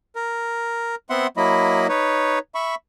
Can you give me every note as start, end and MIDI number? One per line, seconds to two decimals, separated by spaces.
0.15 0.95 70
1.10 1.27 59
1.10 1.27 60
1.10 1.27 76
1.10 1.27 78
1.10 1.27 84
1.37 1.87 54
1.37 1.87 58
1.37 1.87 64
1.37 1.87 75
1.37 1.87 83
1.89 2.39 63
1.89 2.39 71
1.89 2.39 73
2.55 2.75 76
2.55 2.75 83
2.55 2.75 85